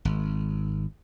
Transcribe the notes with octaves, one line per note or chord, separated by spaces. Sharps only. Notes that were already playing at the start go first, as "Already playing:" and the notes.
G#1